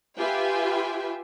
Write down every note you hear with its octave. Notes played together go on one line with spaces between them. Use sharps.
F4 G4 B4 E5 G5 G#5